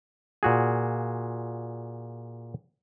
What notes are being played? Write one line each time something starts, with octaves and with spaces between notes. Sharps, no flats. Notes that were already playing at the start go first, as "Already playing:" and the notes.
A#2 F#4 G#4